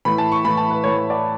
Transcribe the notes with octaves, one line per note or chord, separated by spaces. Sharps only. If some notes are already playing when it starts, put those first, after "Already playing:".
A2 E3 A3 B5
A5
C#6
A2 E3 A3 B5
A5
B4
A2 E3 A3 C#5
C#5
D5